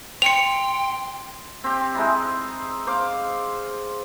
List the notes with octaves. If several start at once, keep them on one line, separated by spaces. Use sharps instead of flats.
G5 C6 C#7 F7
C4 G4
G#3 D#4 E4
C5 F5 D6